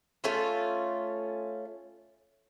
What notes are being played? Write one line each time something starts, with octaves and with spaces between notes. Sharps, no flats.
A3 C#4 F4